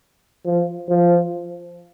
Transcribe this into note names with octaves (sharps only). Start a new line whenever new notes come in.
F3
F3